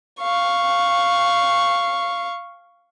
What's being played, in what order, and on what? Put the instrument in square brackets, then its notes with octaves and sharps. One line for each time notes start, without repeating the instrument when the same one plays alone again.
[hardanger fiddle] F5 C#6